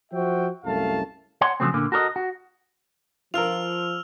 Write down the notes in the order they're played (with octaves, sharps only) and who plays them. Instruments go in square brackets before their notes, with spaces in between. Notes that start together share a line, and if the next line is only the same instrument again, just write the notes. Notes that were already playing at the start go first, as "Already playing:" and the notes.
[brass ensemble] F3 F#4 C5 E5 G5
C2 F#2 A3 F5 A5
[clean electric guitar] C#5 F#5 C6
C#3 F3 F#3 A3 C4
A#2 D3 A#3
F#4 A4 A#4 C#5 D#5
F#4
[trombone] F3 [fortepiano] F4 A#4 [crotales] E6 F6 F7